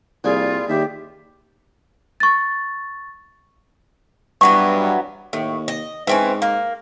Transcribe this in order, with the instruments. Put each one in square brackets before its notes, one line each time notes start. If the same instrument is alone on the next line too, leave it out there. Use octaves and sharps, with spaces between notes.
[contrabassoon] C2 [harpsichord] A#2 G3 G#4 [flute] F4
[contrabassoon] D#2 [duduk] G4 [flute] E5
[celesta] C#6 A6
[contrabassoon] G2 [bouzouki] E3 F#3 B3 [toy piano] C#6
[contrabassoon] D#2 [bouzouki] A2
[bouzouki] D#5
[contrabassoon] G#2 [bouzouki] E3 C4 C#4
[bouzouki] A#3